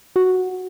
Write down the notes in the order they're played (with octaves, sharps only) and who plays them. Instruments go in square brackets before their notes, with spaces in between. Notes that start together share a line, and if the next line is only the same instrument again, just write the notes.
[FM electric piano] F#4